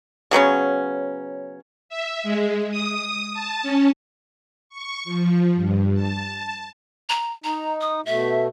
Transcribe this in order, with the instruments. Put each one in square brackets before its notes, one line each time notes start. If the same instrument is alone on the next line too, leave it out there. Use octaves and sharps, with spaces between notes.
[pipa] C#3 F#3 B3 C#4
[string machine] E5
G#3
D#6
A5
C#4
C#6
F3
G2
A5
[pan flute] A#5
[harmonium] D#4 [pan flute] A#5
[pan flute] D#6
[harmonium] B2 A3 [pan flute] E5